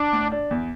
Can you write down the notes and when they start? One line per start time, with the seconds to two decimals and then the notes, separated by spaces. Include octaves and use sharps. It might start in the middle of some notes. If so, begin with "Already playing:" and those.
Already playing: D4
0.13 A2
0.32 D4
0.51 E2